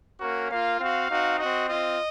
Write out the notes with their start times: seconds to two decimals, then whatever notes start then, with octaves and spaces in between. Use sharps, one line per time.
0.20 A#3 C#4 F#4 A#4
0.49 A#3 F4 F5
0.80 C4 F#4 F5
1.09 C4 D#4 F#4
1.38 C4 F#4 D#5
1.69 C4 F4 D#5